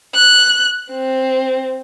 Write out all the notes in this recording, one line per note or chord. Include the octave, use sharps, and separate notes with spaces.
F#6
C4